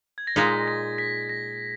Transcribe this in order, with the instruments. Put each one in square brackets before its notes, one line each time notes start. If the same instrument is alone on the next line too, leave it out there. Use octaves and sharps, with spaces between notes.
[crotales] G#6
A#6
[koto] A#2 G#3 D#4 [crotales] B6
[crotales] A#6
B6
A#6